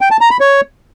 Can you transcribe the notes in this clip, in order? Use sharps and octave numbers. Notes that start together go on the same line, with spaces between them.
G5
A5
A#5
B5
C#5